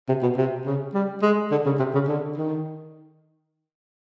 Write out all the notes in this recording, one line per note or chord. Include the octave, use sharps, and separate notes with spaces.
C3
B2
C3
C#3
G3
G#3
D3
C#3
C3
C#3
D3
D#3